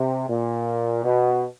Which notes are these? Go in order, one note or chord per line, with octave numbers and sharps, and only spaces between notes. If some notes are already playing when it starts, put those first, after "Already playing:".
Already playing: C3
A#2
B2